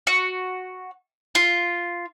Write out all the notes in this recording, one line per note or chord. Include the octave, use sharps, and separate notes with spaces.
F#4
F4